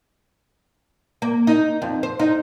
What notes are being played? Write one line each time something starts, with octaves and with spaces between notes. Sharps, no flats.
A#3
D#4
F2
C5
D#4